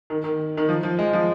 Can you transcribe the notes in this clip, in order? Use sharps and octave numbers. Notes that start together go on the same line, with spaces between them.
D#3
D#3
D#3
F3
F3
G#3
F3